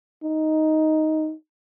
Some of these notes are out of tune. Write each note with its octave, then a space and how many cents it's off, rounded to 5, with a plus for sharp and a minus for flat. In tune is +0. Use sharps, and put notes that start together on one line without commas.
D#4 +5